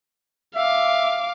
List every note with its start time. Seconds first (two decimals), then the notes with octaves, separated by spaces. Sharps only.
0.55 E5 F5 D6